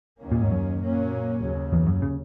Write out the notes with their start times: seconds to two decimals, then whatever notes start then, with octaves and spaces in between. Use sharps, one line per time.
0.21 D#2 D#3 A#3 C#4
0.32 A#2
0.41 G#2
0.51 F#2
0.82 A#2 F#3 A#3 C#4
1.41 D#2 C#3 F#3
1.73 E2
1.87 F#2
2.02 C#3